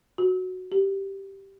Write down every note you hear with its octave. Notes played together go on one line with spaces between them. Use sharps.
F#4
G4